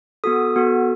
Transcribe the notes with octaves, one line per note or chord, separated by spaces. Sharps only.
B3 F#4 A4 D#6
B3 F#4 A4